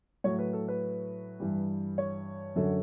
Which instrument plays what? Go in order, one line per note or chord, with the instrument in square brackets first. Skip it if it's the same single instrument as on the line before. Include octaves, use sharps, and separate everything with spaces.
[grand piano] A2 F#3 C#5
B4
A4
B4
G2 E3 G3
C#5
F#2 D3 F#3